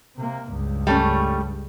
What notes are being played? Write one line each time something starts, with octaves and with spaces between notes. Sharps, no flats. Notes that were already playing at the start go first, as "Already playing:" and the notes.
C3 A#3
C#2 G2
G3 A3 C#4